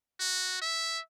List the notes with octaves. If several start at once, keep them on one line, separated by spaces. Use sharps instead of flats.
F#4
E5